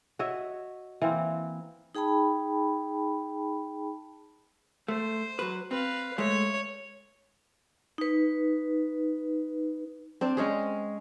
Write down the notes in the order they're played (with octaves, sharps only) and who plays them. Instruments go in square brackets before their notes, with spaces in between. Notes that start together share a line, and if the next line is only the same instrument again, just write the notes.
[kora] F#4 C#5 D#5 E5
E3 A#3 C4
[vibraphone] D#4 G#4 G5 A5 B5
[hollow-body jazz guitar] A3 [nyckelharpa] C5
[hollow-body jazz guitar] F#3 B4
[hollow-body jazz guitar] C4 [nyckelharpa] B4 F5
[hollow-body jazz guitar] G#3 A3 [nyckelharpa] C#5
[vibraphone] D#4 B4
[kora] C4 D4 D5
G#3 C#4 G#4